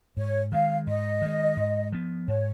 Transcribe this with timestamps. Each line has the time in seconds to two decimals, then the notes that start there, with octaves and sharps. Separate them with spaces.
0.16 G#2 C#5
0.52 D#3 G#3 F5
0.87 G#2 D#5
1.22 D#3 G#3
1.57 G#2
1.92 F3 B3
2.28 G#2 C#5